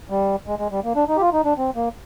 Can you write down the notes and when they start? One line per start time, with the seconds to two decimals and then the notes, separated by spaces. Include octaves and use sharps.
0.10 G3
0.47 G#3
0.59 G#3
0.72 G3
0.84 A#3
0.96 D4
1.08 D#4
1.17 G4
1.21 F4
1.33 D#4
1.45 D4
1.58 C4
1.76 A#3